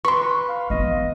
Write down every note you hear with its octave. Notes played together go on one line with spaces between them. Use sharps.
B4 C6 C#6
F5
E3 B3 D#5